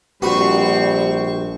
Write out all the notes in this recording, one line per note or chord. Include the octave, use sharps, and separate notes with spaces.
A#1 G3 C4 F#4 B4 C#6